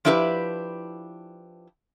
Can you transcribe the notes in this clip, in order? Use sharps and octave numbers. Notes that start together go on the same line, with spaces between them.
F3 D4 E4 G4 A4 B4